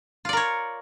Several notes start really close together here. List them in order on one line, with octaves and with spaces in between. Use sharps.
F4 D5 A#4 C#5